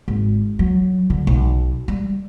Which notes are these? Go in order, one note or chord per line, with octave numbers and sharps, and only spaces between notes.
G#1
F#3
D3
B1
G3